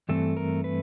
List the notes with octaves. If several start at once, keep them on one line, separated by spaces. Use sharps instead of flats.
G2 E3 A3 C4 A4
A#4
B4